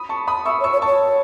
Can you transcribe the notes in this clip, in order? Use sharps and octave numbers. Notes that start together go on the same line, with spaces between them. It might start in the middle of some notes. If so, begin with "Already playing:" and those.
Already playing: B5 D#6
A5 C#6
B5 D#6
E5 C#6 E6
C#5
C#6 E6
C#5
A5 C#6
C#5